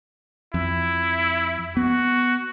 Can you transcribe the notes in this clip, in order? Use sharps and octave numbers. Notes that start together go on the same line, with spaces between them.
F2 E4
B3 F#4